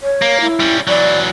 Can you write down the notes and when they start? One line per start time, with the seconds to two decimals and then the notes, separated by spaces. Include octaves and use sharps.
0.01 C#5
0.22 A#3
0.41 E4
0.60 G3 C#4
0.88 E3 F#3 D5